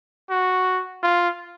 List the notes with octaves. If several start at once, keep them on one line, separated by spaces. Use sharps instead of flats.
F#4
F4